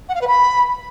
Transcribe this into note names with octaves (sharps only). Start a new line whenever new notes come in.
F#5
F5
B4
B5